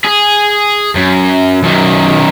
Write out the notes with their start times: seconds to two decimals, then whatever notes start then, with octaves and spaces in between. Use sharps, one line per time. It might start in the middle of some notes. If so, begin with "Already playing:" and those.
0.04 G#4
0.95 F#2
1.63 F#2 D#3